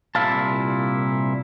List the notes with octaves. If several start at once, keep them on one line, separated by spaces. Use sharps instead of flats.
C2 A#2 E4 F5 A5